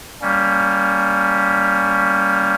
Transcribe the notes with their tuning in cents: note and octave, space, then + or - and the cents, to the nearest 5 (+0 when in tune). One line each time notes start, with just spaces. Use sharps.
G3 +5 A#3 +0 C#4 +20